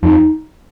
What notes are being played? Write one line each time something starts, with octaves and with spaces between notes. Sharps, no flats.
F2 D#4